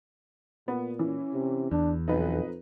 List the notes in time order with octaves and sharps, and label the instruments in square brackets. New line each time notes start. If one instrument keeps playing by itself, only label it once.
[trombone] A#2 [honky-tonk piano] B3
[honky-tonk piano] E3 [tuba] C#4
[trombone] C3
[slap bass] E2 [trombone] D4
[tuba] B1 [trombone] F2 [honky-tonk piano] D#4 B4